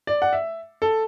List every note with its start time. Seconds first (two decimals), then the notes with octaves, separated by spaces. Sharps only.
0.07 D5
0.22 F#5
0.33 E5
0.82 A4